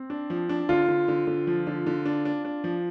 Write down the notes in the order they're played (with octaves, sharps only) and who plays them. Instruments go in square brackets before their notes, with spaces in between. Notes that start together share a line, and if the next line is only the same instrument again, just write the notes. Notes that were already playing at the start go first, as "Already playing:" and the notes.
Already playing: [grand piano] C4
[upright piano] D4
F3
D4
[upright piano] D3 [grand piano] F4
[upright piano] D3
D3
D3
F3
D3
D3
D4
D4
D4
F3